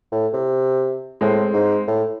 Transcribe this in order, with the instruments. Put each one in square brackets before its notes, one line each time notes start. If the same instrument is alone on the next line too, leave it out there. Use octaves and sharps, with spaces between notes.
[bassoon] A2
C3
[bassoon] A2 [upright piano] G#3 C4
[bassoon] G#2
A2